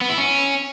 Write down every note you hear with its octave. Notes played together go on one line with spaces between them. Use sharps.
B3
E4
C#4